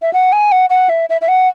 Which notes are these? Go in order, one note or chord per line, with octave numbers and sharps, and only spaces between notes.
E5
F#5
G#5
F#5
F#5
E5
E5
E5
F#5